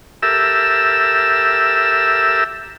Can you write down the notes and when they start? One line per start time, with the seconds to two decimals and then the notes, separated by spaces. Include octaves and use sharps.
0.23 G4 A4 A#4 E5 E6